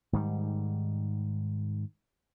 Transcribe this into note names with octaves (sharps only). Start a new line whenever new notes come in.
G#2 D#3 G3